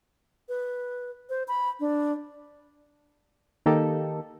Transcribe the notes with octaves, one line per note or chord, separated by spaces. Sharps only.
B4
C5
B5
D4
D#3 A#3 D#4 G4 A4